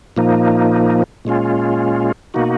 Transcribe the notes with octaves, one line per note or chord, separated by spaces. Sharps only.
A#2 F3 A#3 D#4
A#2 G#3 C#4 F4
B2 A#3 D#4 F#4